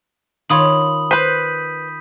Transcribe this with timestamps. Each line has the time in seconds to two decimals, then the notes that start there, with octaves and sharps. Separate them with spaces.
0.50 D#3 F4 C#5 B5 D#6 F#7
1.11 B4 C5 G6 B6 D#7